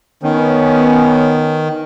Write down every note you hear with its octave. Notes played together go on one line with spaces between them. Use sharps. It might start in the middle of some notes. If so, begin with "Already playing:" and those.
D#3 B3 C#4